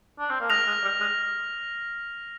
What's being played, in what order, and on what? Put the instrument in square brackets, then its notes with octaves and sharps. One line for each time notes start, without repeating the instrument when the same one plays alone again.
[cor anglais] D4
C4
A#3
[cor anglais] G#3 [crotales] F6 A#6 F7
[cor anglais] G#3
G3
G#3